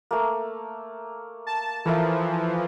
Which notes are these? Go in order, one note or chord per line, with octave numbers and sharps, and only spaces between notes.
A3 A#3
A5
E3 F3 A4 A#4 E5